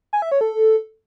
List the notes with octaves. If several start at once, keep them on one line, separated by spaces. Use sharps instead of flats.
G#5
E5
C#5
A4